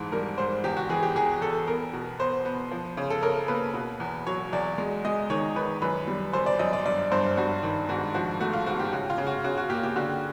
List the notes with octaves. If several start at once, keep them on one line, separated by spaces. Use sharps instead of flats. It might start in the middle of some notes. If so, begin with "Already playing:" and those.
Already playing: F2 G#2 E3
G3 A#4
G#2 C5
E2 G4
F#4
E3 G#4
G4
E2 G#4
E2 A4
B3 A#4
B2
B3 C5
B3
F3
C#3
A4
C#3 A#4
A#3 B4
B2
E2
F#3 C#5
E2 D5
G#3
G#3 D#5
D#3 C#5
D#3 B4
F#2 B4
G3
F#2 C5
D5
F#2 D#5
D5
G2 D5
G2 C5
G2 F#4
D#3
G#2 F#4
F3 F#4
A3 F#4
F4
G#2 F#4
G4
C#3 F#4
F4
C#3
F#4
C#3 F#4
F#4
A#3 G4
G4
D3 F#4